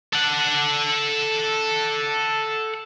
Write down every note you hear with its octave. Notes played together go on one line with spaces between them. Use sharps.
A4 F#5